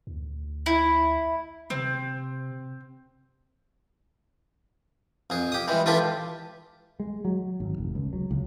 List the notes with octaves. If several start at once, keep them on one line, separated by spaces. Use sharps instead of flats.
D2
E4
C3 C4
F2 G#4
G4 D#6
E3 G3 G#3
E3 E4 F4 G4 A4 B4
G#3
F#3
G#1
F1
C#2
F#3
C#2